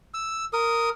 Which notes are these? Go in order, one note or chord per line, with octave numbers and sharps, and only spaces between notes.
E6
A#4 D#6